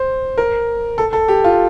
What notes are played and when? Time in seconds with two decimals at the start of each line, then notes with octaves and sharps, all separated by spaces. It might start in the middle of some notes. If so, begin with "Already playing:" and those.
Already playing: C5
0.38 A#4
0.98 A4
1.13 A4
1.28 G4
1.44 F4